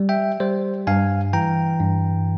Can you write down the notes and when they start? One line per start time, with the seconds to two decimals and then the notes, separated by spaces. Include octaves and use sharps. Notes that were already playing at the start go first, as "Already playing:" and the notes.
Already playing: G3
0.09 E5 G5
0.40 G3 C5
0.87 G2 F5 G#5
1.33 E3 G5 A#5
1.80 G2